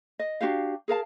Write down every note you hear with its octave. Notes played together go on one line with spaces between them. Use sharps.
D#5
D4 F#4 G4 F5
G#4 A#4 F5 A5